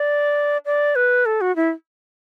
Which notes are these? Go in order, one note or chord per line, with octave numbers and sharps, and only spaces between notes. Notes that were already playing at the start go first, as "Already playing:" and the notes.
Already playing: D5
D5
B4
A4
F#4
E4